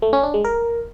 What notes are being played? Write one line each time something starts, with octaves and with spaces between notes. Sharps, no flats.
A3
C#4
D4
G#3
A#4